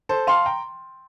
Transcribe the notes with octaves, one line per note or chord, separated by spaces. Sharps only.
A4 C5
F5 G5 A5 C6
G5 A#5